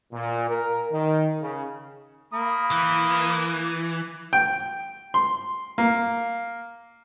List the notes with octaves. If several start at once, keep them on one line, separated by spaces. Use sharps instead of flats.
A#2
A#4
D#3
C#3
A#3 B5 D#6
E3
G5
C6
A#3